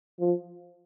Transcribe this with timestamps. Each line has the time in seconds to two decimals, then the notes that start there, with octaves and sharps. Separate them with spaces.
0.20 F3